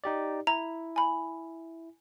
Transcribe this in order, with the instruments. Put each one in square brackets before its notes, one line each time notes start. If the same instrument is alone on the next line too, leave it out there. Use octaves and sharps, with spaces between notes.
[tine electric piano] D#4 G4 D5
[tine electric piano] E4 [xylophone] A#5
[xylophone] G#5 B5